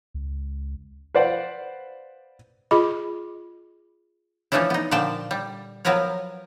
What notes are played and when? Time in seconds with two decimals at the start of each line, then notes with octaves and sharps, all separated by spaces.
0.14 C#2
1.15 B4 C5 D5 F5 F#5
2.71 F4 G#4 D#5 B5 D6
4.52 E3 F3 A3 C#4 D4 E4
4.70 B3 D#4
4.91 A#2 D3 F3 D5 G5 A5
5.31 G3
5.85 F3 F#3 B3 A#4 B4 C#5